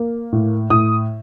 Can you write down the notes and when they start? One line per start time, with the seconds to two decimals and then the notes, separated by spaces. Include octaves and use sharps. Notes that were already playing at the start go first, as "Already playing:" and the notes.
Already playing: A#3
0.32 A2
0.70 A2 D#6